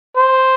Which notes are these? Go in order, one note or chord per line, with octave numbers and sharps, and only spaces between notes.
C5